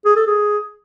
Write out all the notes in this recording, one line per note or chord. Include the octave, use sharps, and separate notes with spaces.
G#4
A4
G#4